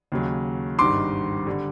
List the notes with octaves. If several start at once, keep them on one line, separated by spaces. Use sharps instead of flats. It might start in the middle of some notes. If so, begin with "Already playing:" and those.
D#2 C#3 F#3
G#1 G2 D#3 G3 C6 D6
D3 G3